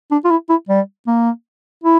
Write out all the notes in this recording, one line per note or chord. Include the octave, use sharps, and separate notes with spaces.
D4
F4
E4
E4
G3
A#3
E4